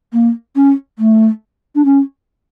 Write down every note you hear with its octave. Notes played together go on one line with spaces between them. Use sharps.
A#3
C#4
A3
D4
C#4